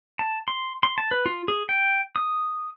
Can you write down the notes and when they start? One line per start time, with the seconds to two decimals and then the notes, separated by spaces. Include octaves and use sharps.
0.19 A5
0.48 C6
0.83 C6
0.98 A5
1.11 B4
1.26 F4
1.48 G#4
1.69 G5
2.16 D#6